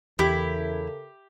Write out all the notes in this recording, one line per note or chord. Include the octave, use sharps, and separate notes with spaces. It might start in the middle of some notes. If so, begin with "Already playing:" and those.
E2 C#3 E4 G4 A4 A#4